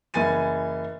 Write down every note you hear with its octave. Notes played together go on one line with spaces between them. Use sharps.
F#1 E3 G#5 A6 D#7